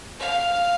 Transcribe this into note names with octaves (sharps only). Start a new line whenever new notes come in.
F5